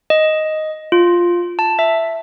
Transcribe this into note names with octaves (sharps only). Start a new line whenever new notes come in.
D#5
F4
A5
E5